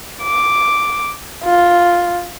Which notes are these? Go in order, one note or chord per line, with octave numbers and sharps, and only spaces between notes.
D6
F4